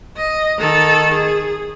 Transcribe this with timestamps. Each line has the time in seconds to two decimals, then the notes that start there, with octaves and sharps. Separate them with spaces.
0.17 D#5
0.59 D#3 A4
1.13 G#4